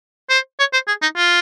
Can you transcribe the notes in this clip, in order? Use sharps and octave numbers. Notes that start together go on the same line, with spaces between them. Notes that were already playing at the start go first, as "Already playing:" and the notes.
C5
C#5
C5
G#4
D#4
F4